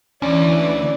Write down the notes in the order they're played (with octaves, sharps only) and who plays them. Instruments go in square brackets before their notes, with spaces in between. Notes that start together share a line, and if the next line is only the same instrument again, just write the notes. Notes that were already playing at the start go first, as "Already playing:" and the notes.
[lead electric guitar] D2 [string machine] E3 [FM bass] C#4 [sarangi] D5